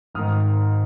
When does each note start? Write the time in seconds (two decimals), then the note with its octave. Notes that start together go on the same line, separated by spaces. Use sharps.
0.14 G#1 G#2 D#3 D#6 F6